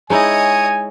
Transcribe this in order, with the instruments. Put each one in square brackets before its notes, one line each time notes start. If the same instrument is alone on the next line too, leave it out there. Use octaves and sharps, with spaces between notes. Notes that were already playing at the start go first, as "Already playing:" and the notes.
[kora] G#3 D#4 E4 [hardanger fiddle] C#5 D#5 [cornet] G#5